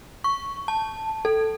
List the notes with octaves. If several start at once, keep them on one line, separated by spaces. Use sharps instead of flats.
C#6
A5
A4